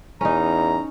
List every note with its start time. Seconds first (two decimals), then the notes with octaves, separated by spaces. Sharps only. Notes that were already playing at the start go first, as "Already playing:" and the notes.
0.21 E2 C#4 D#4 A#5